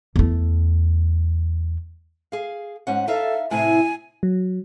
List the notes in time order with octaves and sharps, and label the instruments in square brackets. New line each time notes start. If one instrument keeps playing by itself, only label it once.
[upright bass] E2 A3
[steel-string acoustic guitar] G#4 F5
G#2 C#4 F#5
[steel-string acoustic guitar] D#4 E5 F5 [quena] A4
[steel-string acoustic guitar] A2 C3 E4 [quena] G#5
[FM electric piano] F#3